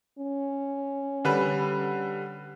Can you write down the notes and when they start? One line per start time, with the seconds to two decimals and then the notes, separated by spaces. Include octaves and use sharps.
0.19 C#4
1.25 D3 G3 B4